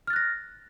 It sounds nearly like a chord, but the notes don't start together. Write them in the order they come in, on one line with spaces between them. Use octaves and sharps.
F6 A6 F#6 A#6